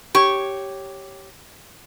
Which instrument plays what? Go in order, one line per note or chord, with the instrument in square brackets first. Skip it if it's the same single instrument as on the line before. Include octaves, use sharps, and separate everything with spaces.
[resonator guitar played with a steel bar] G4 C#5 [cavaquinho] C#6